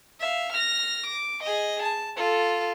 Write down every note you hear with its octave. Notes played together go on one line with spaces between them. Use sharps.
E5 F5
F6 A#6
D6
G#4 D#5
A5
F4 A4